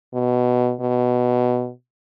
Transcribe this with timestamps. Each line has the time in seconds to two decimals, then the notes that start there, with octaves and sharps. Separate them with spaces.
0.14 B2
0.81 B2